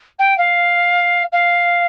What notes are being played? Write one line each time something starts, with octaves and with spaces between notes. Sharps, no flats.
G5
F5
F5